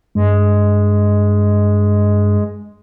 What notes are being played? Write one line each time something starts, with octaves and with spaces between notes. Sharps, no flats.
G2 G#3